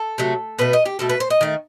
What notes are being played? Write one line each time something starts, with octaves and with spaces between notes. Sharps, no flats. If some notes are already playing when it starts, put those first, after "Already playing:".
Already playing: A4
C3 F#3 A3
B2 A3 B4
D#5
G4
B2 A3 A4
B4
C5
D#5
D#3 A3